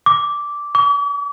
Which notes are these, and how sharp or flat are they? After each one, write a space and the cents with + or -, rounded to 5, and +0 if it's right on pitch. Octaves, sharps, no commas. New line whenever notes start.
D6 -10
D6 -45